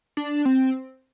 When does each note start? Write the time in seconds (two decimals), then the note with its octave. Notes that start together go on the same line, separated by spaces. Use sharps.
0.17 D4
0.45 C4